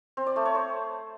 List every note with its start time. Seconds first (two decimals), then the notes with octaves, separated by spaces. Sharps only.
0.17 C4
0.27 D5
0.36 A3
0.45 C#5
0.55 C5